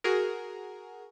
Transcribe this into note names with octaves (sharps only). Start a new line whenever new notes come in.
F#4 G#4 A#4